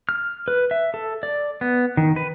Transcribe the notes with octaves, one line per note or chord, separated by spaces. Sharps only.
F6
B4
E5
A4
D5
B3
D#3
B4